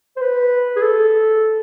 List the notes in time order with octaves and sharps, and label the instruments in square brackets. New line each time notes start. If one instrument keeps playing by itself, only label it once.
[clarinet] C5
B4
G#4
A4